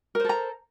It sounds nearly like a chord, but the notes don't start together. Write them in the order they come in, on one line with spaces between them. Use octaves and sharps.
A#4 C5 A4 A#5